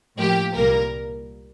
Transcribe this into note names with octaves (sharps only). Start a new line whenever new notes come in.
A2 F3 A#3 G4
C2 A#2 G3 A#3 A#4